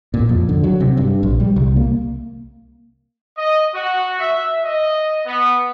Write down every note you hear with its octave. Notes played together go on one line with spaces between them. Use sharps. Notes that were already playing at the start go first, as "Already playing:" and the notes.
A#2
F2
D3
F#3
C3
G2
A#1
G3
C2
A#3
D#5
F#4
E5
D#5
B3